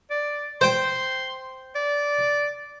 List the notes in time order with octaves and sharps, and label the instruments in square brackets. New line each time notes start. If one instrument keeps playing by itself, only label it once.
[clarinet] D5
[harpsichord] C5 G5 [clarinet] C6
[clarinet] D5